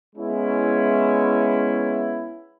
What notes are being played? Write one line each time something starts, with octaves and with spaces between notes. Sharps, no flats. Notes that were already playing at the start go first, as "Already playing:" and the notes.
G#3 B3 C#4 E4